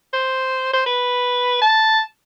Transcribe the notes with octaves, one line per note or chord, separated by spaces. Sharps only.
C5
C5
B4
A5